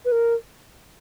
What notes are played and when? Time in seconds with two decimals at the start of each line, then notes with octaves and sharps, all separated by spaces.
0.05 B4
0.12 A#4